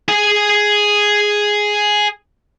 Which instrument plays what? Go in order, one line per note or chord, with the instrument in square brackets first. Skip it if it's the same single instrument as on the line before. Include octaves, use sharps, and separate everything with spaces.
[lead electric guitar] G#4 G#5